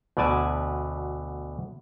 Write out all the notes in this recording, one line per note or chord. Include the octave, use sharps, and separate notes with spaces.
D2 B2 D3 D5 G#5 A5